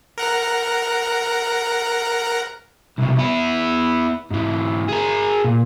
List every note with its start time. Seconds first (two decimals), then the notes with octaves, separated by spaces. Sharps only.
0.18 A#4 F#5 A#5
2.99 C2 B2
3.19 B3 E4
4.31 G#2 E3
4.89 G#4 A#4
5.44 A#2